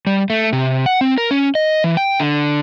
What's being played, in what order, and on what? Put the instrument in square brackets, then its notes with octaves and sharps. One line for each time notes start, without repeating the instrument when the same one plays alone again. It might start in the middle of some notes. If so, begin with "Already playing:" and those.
[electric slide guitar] G3
A3
C3
F#5
C4
A#4
C#4
D#5
E3
G5
D3